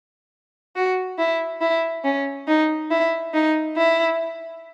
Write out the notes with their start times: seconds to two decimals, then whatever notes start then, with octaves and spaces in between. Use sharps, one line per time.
0.76 F#4
1.18 E4
1.61 E4
2.04 C#4
2.47 D#4
2.91 E4
3.34 D#4
3.77 E4